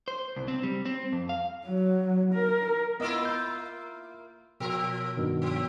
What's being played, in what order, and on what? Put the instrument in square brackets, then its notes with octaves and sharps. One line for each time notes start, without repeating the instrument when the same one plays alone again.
[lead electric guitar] C5
C2
C4
G3
C4
F2
F5
[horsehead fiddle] F#3
A#4
[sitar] A#3 E4 F4 [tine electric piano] B3 D#5
[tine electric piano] G6
[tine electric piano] B2 [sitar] F3 A#4
[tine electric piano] G2 B2 D#3
[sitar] F3